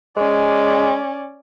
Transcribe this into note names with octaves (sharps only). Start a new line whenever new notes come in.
G#3 C#4 D5